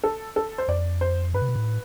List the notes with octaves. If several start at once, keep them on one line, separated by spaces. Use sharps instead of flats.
A4
A4
C5
F2 D5
C5
G2 B4
C3
B2
A2